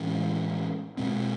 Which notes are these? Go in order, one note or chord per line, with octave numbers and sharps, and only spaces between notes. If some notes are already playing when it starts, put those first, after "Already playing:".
Already playing: A2 E3 G#3 C#4
B2 G#3 C4